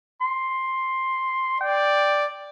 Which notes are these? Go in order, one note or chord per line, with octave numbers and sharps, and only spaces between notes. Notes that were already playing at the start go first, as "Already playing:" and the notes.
C6
D5 G5